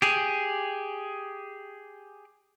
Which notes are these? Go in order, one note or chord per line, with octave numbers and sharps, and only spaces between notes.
G4 G#4